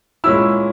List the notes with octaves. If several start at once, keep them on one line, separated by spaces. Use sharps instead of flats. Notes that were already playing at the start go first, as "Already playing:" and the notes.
A#2 G#3 C#4 E4 E6